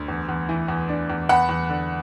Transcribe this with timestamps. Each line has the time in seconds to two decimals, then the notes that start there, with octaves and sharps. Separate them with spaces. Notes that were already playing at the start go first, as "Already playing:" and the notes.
Already playing: D2
0.08 E2
0.29 E2
0.49 E3
0.68 E2
0.89 D4
1.10 E2
1.29 E2 F#5 B5
1.49 E2
1.69 D3